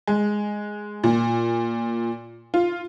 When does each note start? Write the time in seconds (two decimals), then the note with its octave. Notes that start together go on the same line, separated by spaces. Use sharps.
0.07 G#3
1.04 A#2
2.54 F4